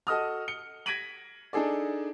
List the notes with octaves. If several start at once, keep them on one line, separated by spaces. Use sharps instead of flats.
F#4 A4 D#5 D#6 F6
C#7 G7
G#6 A#6 B6 D7 D#7 F#7
D4 D#4 G#4 A4 D5